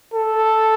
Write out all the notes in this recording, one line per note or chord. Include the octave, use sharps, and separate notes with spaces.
A4